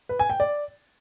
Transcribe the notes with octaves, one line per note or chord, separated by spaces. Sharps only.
B4
G#5
G5
D5